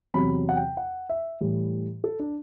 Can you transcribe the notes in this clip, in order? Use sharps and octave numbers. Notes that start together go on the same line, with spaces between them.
E2 C3 F#3 B5
F#5
G5
F#5
E5
A2 E3 G3
A4
D4